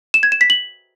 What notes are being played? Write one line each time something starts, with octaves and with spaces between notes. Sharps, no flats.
E7
G#6
E7
B6
F#7